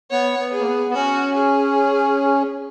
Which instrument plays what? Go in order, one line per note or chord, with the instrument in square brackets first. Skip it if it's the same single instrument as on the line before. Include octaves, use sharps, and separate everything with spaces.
[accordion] B3 [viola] C#5
[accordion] B3
[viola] G#4
[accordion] A#3
B3
B3
[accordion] C#4 [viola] F#4
[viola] G#4